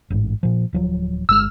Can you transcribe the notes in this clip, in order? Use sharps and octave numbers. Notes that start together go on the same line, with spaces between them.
A1 G#2
A#2 F3
D1 F3 F#3
G1 G#3 E6 F6